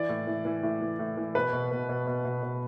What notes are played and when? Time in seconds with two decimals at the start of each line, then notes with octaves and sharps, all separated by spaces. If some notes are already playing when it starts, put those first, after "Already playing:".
Already playing: E3 D5
0.09 A2
0.27 E3
0.45 E3
0.63 A2
0.81 E3
0.99 A2
1.17 E3
1.35 B2 B4
1.53 B2
1.71 B2
1.89 B2
2.07 B2
2.25 B2
2.43 B2